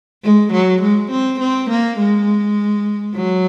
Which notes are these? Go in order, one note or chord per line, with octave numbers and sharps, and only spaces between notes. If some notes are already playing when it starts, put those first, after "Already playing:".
G#3
F#3
G#3
C4
C4
A#3
G#3
F#3